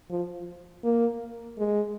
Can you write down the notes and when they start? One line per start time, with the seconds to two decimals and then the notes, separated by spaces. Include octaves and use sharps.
0.10 F3
0.84 A#3
1.58 G#3